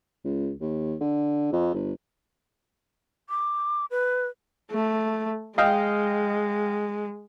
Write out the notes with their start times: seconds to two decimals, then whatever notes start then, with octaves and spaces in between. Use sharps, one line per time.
0.24 C#2
0.61 D#2
1.01 D3
1.52 F2
1.74 G1
3.29 D6
3.91 B4
4.72 A3
5.58 G#3 D#5 F5 G5